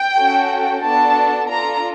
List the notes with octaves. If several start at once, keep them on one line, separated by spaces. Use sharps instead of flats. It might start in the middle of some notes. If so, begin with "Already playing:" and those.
Already playing: G5
C#4 F#4 A4
B3 D4 F#4 A4 A5
D4 F4 A4 A#5